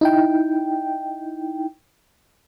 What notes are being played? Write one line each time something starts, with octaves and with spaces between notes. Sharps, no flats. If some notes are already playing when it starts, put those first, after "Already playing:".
D#4 E4 G5